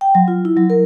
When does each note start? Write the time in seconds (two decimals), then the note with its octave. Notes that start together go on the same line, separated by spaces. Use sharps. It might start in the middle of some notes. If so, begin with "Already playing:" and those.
0.01 G5
0.15 F#3
0.28 F4
0.45 E4
0.57 F#3
0.70 A#4